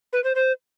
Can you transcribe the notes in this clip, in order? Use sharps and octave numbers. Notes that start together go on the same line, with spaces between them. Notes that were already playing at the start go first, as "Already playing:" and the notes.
B4
C5
C5